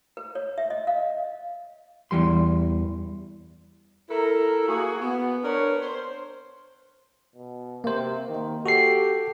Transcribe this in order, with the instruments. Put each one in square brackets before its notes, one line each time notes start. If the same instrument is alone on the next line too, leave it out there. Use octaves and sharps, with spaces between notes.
[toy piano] B4
C#5
E5
D#5
F5
[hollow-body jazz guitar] E2 E3 G3 C6
[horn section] E4 A4 A#4
A#3 F#4 G#4
B3
D4 A#4 B4 C#5
C5
[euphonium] B2
[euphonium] C3 [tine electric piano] A#3 C5
[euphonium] D#3
[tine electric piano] F#4 A4 C7 [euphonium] G4